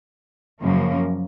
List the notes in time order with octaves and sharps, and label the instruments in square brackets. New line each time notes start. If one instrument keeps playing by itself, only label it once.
[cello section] F#2 C#3 F3 A#3